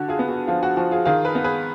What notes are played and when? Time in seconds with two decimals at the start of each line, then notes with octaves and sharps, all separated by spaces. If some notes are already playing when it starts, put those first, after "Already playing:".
Already playing: D3 F#4
0.08 F4 G#4
0.19 B3
0.28 F#4
0.47 F3 F4
0.63 F#4
0.77 F3 F#4
0.91 F4 G#4
1.05 D#3 F4 G#4
1.25 G#4 B4
1.35 B3
1.44 G#4 B4